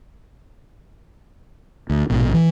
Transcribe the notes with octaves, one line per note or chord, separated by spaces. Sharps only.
D2
A#1 G#2 B2
E3